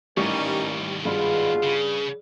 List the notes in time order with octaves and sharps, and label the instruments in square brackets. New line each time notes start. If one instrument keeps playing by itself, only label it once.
[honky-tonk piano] A1 G3 C#6 [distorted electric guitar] D#2 G#2 [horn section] A#3 C#4 D#4
[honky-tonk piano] G2 [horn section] B2 F4 [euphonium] G#4
[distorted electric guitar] C#3